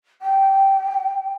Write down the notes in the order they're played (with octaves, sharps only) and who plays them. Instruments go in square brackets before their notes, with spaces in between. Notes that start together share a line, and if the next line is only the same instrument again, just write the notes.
[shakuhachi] G5